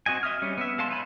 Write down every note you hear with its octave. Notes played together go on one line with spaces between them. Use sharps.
C4 F#4 D#5 G#5
D#5 E5 D#6 F6
G3 C#4
B3 E5
G#3 F5 A5 C6
D#4 E5 G#5 B5